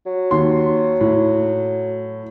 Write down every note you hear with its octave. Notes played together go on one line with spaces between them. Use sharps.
F#3
D#2 C6
A2